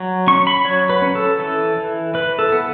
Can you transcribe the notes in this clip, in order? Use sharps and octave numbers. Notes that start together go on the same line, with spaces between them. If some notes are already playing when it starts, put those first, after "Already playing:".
Already playing: F#3
C#4 C#6
B5
F#3 C#5
B4
C#4
A4
E3 A4
E3
E3 B4
A4
B3